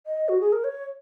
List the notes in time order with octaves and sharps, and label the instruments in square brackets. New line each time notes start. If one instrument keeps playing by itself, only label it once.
[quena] D#5
F#4
G#4
A#4
C#5